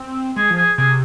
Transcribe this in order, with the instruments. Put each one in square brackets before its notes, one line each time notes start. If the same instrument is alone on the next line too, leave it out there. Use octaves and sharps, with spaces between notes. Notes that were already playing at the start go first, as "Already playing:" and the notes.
Already playing: [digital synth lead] C4
[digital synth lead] G#3 [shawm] G#4
[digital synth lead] F3
[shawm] G#4
[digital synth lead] C3 [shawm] G#4